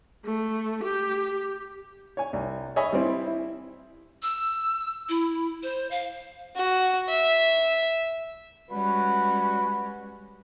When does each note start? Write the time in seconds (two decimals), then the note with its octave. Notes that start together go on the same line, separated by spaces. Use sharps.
0.25 A3
0.84 G4
2.17 C#5 G#5
2.33 C2
2.76 C#5 D#5 E5 G#5 B5
2.93 G3 C4 E4
3.27 E4
4.23 E6
5.09 E4
5.63 C5
5.91 F5
6.56 F#4
7.09 E5
8.71 G3 G#3 C#4 F#4 B4